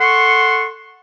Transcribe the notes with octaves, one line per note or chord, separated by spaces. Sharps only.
A4 F#5 C6 C#6